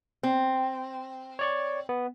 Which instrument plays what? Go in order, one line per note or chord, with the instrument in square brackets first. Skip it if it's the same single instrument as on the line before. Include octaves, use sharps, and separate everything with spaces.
[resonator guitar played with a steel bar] C4
[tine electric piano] C#5 D5 C#6
B3